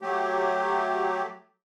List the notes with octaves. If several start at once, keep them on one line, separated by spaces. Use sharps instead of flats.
F#3 A3 G4